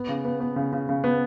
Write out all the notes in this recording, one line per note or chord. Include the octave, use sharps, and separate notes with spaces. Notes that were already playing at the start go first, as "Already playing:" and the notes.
Already playing: B3
C#3
B3
B3
C#3
C#3
C#3
B3